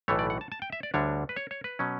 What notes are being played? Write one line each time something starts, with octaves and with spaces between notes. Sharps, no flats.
B1 A2 E3 A3 C#5
D5
F#5
A5
A5
G5
E5
D5
D2 D3 G3 D4 C#5
B4
C#5
C#5
B4
B2 F#3 C#4